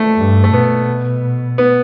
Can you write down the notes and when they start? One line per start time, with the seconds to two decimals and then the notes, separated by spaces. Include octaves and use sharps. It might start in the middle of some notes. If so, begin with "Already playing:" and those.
Already playing: A3
0.18 G2
0.44 A3
0.52 B2 B3
1.58 B3